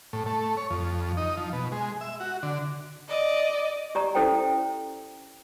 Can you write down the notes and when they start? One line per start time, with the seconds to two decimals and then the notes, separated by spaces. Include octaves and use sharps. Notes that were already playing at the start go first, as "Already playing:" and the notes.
0.13 A2
0.26 A3
0.57 C#5
0.70 F2
1.17 D#4
1.37 F3
1.53 B2
1.72 G#3
2.01 E5
2.20 F#4
2.43 D3
3.08 D5 D#5
3.95 G4 D5 A#5
4.15 C#4 E4 A4 C5 G5